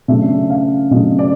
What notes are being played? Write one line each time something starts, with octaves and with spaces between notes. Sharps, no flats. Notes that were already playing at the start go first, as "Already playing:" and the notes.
C#3 F#3 A3 D4 E5
F5
C#3 F#3 A3 D4 D#5
D5